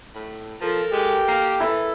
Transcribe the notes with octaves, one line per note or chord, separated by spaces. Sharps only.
A2
F3 A4 A#4
G#3 G4
A#3
E3 E4 A4 B4 B5